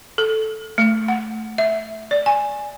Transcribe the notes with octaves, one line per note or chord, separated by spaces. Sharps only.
A4
A3
F#5
E5
D5
G#5